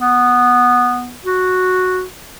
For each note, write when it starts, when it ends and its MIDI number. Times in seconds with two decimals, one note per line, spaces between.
0.01 1.16 59
1.25 2.03 66